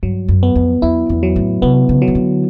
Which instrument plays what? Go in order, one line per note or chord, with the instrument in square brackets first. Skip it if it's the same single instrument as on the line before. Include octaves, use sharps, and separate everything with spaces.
[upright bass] G2 [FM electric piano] F#3
[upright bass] F#2
[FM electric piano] B3
[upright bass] F2
[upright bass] E2 [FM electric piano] E4
[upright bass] E2
[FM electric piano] F#3
[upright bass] A2
[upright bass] C3 [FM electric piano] B3
[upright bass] C#3
[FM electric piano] F#3
[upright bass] D#3
D3